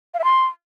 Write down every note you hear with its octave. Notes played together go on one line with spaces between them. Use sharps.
F5
E5
C6